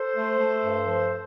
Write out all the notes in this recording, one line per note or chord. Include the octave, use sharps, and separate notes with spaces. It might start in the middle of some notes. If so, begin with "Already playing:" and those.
Already playing: A4 C5
A3
A3
G2
F3